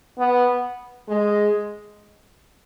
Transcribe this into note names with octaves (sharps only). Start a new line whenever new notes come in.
B3
G#3